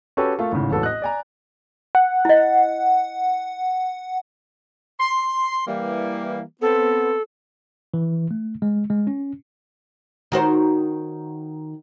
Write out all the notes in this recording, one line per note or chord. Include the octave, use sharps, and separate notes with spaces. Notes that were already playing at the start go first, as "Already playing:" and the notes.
C#4 F#4 G4 A4 B4 C#5
A3 A#3 F4 A4
G#1 A2 C#3
E1 A1 A2 A4 B4
D#5 F#6
D5 G#5 A#5
F#5
E4 D#5
C6
E3 G3 A#3
B3 C4 A4
E3
A3
G#3
G#3
C#4
D#3 F#4 C5